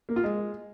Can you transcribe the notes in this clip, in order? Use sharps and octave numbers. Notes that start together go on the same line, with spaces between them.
A#3
F4
G#3